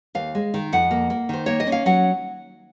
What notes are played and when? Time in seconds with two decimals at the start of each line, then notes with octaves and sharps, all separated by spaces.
0.15 D#2 F5
0.35 G#3
0.54 D#3
0.72 F2 F#5
0.91 A#3
1.10 A#3
1.29 D#3 C5
1.46 A#3 C#5
1.60 D#5
1.67 C#4
1.72 F5
1.86 F#3 F#5